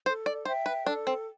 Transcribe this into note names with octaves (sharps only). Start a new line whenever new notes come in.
A4 C5
D5
C5 E5 G5
B4
D4 A4
C4